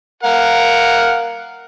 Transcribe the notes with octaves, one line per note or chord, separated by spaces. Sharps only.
A#4 F5 F#5